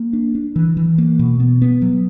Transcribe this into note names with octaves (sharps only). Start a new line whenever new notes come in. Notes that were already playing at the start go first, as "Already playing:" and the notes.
Already playing: A#3
D4
D4
E3
E3
A#3
B2
B3
B3
F#3